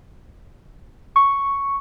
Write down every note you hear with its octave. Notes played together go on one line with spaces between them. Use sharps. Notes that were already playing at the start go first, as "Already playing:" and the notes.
C#6